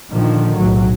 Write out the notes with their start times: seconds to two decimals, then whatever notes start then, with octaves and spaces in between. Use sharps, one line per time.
0.12 A#2 D3 D#3 F3
0.57 B1 A2 F#3